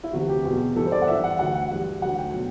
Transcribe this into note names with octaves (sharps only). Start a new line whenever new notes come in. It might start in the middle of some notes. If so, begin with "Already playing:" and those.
E4
D2 C3 E3 F#4
G4
E2 B2 F#3
G2 E3 A4
C5
D5
F#5
G2 E3 E5
F#5
D2 D3 F#3 F#5
F#5
G2 E3
D2 D3 F#3 F#5
G5
B2 F#3